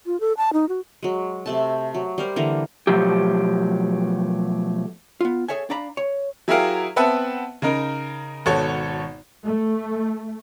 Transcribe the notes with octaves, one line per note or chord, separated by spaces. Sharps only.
F4
A4
A5
D#4
F#4
F#3 G#3
C3 A3 A5
F#3
G3 A#4 C5
D3 E3 A#3 A#5
B2 F3 F#3 A3 G4
B3 F4
G#4 A4 C#5 E5 G#5
D4 D5 F5 A#5 B5
C#5
F#3 E4 G4 G#4 A#4 F5
B3 C4 B4 E5 F#5 A5
C#3 D#4 A#4
G#1 B2 A4 C#5
A3